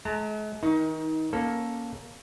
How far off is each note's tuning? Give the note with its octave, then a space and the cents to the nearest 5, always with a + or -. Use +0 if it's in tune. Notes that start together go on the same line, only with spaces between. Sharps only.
G#3 +45 A#5 -35
D#3 +30 D#4 +20
A#3 +10 C#4 +0 A4 +0